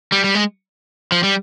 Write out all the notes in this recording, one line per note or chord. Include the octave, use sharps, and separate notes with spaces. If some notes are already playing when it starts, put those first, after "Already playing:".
G3
G3
G#3
F3
G3